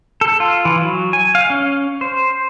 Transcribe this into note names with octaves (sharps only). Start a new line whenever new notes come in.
A4
F4
E3
F#3
G#5
F5
C#4
C5